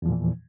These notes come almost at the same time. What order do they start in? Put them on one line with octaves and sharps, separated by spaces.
E2 F3 A#2 E3